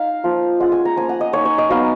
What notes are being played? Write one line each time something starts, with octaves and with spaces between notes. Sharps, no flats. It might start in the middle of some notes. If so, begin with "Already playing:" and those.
Already playing: D#4 F5
F3 A#3 F4
G#3 C#4 F4 F#5
G#5
A#5
F3 A#3 C#4 G#5
F#5
D#5
A#3 D#4 C#5
C#5
D#5
F#3 B3 D#4 F5